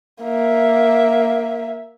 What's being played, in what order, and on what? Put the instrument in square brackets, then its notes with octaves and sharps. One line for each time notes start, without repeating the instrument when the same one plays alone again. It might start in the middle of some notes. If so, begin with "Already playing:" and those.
[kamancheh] A#3 E5